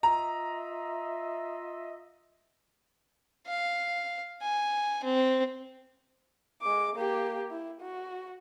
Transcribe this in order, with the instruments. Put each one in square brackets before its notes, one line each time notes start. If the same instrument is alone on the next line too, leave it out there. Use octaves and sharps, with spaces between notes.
[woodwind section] F4 D#5 E5 [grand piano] A#5
[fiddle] F5
G#5
C4
[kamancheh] G#3 D6
A#3 G4
E4
F#4